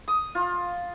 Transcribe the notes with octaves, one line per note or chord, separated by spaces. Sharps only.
D#6
F4